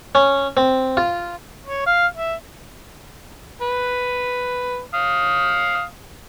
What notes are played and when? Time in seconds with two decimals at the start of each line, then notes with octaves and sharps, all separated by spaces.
0.15 C#4
0.57 C4
0.97 F4
1.66 C#5
1.86 F5
2.16 E5
3.62 B4
4.94 F5 D#6